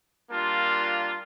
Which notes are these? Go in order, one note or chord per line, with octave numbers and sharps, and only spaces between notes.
G3 A#3 D4 F4